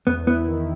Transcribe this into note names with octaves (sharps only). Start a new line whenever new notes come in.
E2 B3
B3 E4
D#3